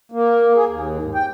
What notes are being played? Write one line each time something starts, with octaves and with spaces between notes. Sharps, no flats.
A#3
G#4
D#2
G#2
G5